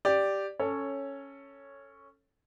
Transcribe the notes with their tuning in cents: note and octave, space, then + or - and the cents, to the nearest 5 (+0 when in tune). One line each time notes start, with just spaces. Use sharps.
G4 +0 D5 +0
C#4 -5 A4 +10 C#5 +0